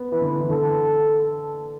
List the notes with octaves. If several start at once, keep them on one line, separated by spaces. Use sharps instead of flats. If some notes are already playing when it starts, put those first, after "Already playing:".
Already playing: B3
E3 B4
D3
E3
D3 A4